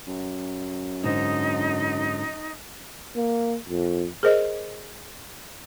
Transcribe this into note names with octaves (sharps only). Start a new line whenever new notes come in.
F#2
G#2 D3 D#4
A#3
F2
G#4 A#4 C5 D#5